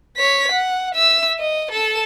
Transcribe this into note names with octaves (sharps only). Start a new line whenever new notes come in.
C#5 B6
F#5
E5 E6
D#5
A4 E7